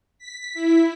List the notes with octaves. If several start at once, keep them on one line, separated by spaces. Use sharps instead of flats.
B6
E4